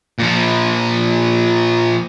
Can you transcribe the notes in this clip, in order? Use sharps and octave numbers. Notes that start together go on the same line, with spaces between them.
A#2 F3